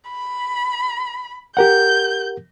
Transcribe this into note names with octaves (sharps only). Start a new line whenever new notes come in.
B5
G4 A#4 F#5 G6